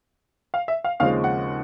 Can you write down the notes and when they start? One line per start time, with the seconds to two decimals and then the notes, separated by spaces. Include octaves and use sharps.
0.54 F5
0.68 E5
0.84 F5
1.00 D#2 C#3 F3 G#3 C4 F5
1.24 F#5